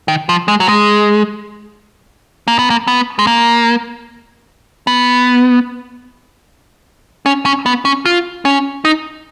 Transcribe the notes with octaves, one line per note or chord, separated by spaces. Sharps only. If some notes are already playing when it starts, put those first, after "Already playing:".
D#3
F3
G#3
F#3
G#3
A#3
B3
A#3
B3
G#3
A#3
B3
C#4
C#4
B3
C#4
F4
C#4
D#4